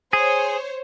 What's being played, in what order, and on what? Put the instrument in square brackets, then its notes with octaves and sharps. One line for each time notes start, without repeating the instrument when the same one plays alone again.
[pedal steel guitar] G#4 [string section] C5 C#5